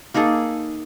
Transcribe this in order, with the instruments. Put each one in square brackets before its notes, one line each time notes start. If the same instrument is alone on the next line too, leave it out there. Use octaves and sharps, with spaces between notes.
[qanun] A#3 D#4 G#4 A4